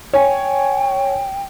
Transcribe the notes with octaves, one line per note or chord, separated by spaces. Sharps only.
C#5 G5 G#5